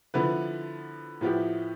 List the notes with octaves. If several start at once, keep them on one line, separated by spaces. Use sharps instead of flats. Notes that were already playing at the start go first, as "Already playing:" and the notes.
D3 F3 B3 E4 B4
A2 F3 B3 E4 G4